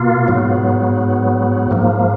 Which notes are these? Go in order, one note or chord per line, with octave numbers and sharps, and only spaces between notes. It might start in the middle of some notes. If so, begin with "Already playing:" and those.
Already playing: B2 A#3 F4
G#2 F#3 B3
G#2 F3 A#3